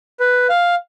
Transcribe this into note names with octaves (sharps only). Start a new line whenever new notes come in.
B4
F5